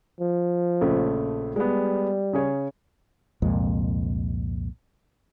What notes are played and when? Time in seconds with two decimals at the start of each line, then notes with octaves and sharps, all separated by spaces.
0.21 F3
0.81 A#1 C#3 A3
1.56 G3 G#3 B3
2.33 C#3 G#4 C#5
3.42 C2 F2 A#2 G#3